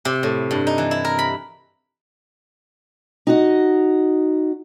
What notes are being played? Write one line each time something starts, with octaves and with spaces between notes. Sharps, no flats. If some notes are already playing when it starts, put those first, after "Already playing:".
C3
A2
G2
D#4
E3
E4
A#4
B5
D#4 F#4 D#5